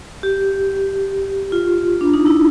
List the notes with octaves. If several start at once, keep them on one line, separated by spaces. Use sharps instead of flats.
G4
F4
D4
D#4
E4